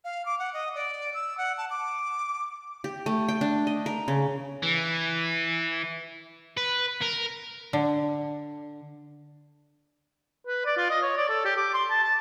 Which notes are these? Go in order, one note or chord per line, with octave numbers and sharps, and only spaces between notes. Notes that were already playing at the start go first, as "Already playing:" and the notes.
F5
D6
F#5
D#5
D5
E6
F#5
A5
D6
G4
A3
G5
D4
D#5
A#4
C#3
E3
B4
A#4
D3
B4
D5
F4
D#5
C#5
D5
A4
G4
D6
C6
A5
A5